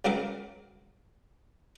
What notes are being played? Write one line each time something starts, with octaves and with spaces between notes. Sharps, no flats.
C#3 F#3 B3 A#4 D6